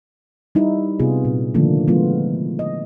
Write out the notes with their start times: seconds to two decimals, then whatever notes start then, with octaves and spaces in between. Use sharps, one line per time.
0.55 G3 D#4 E4
0.99 C3 B3 F4 G#4
1.25 A#2
1.54 D3 D#3 F3 A3 A#3 D4
1.87 F3 G#3 A3 B3 E4 F4
2.59 D#5